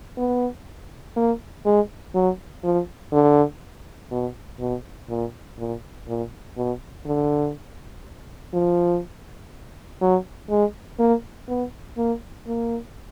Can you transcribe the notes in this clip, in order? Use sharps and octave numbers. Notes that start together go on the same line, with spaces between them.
B3
A#3
G#3
F#3
F3
D3
B2
B2
A#2
A#2
A#2
B2
D3
F3
F#3
G#3
A#3
B3
A#3
A#3